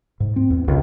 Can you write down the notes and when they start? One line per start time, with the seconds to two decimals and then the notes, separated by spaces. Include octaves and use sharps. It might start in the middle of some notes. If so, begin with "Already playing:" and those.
0.20 G#2
0.36 C4
0.50 E2
0.68 C#2